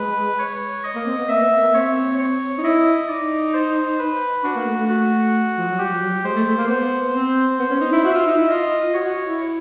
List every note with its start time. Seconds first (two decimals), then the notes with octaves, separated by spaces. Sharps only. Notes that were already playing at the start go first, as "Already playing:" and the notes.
Already playing: G#3 B4
0.39 C#5
0.84 D#5
0.95 A#3
1.06 C4
1.18 B3
1.29 A#3 E5
1.41 B3
1.51 A#3
1.63 A#3
1.74 C4 C#5
2.19 C#5
2.58 D#4
2.63 E4 D#5
3.09 D#4 D5
3.53 C5
3.99 B4
4.44 D4 F#4
4.56 A#3
4.66 A3
4.77 A3
4.88 F#4
5.58 F3
5.69 F#3
5.78 G3 G4
5.90 F3
6.01 F#3
6.24 G#3 C5
6.35 A3
6.46 A3
6.57 A#3
6.69 B3 C5
7.14 C4
7.59 B3
7.70 C#4
7.81 D#4
7.92 E4
8.04 F#4 E5
8.14 F4
8.27 D#4
8.37 E4
8.49 F4 D#5
8.94 F#4 C#5
9.05 F#4
9.28 E4